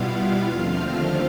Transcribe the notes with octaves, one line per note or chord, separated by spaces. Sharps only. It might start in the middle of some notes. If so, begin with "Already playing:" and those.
Already playing: B2 G3 B3 E4 F4 F5
D#2 D3 F3 A3 C4